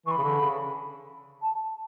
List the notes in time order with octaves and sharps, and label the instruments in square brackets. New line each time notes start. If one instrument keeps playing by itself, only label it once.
[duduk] E3 [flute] B5 C#6
[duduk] C#3
D3
C#3
[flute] A5